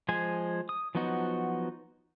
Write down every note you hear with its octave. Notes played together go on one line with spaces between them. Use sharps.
F3 G#3 C5 G#5
D#6
F3 F#3 B3 D#4 F#4